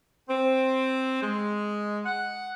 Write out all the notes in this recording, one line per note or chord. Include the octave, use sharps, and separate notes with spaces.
C4
G#3
F#5